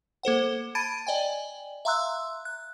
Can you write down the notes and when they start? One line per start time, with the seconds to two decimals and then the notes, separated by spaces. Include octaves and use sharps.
0.23 A#3 A4 C5 F#5
0.75 A5 B5 G#6 A6 D7 D#7
1.07 D5 D#5 G5 G#5
1.85 E5 F5 A#5 C6 E6 F#6
2.45 F#6